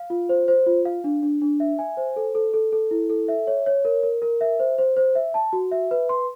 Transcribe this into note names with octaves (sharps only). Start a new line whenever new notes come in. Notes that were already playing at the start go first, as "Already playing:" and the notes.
Already playing: F5
F4
C5
C5
F4
F5
D4
D4
D4
E5
G#5
C5
A4
A4
A4
A4
E4
A4
E5
C#5
C#5
A#4
A#4
A#4
E5
C5
C5
C5
E5
A5
F#4
E5
B4
C6